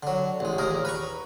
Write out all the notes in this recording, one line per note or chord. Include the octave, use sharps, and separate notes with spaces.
D3 F#3
A1 G#3
D#2 A#2 G#4 A#4
B4 A#5 C#6